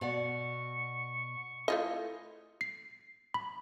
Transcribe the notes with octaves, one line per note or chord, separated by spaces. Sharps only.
B2 D5 F#5 C#6
A3 E4 F4 D#5
C7
B5